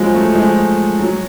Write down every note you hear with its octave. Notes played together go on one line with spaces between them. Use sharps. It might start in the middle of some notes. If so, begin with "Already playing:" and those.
Already playing: F3 F#3 G#3
F#3 A3
F3 G#3
F#3